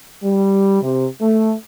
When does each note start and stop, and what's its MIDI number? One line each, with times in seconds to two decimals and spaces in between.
0.24 0.80 55
0.82 1.06 48
1.21 1.52 57